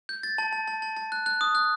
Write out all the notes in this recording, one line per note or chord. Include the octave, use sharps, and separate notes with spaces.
G6
A6
A5
A5
A5
A5
A5
F#6
F#6
D#6
F#6